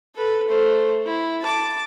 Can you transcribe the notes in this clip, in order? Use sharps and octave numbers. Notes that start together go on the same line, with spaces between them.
A4 B4
A3 C5
E4
A5 D6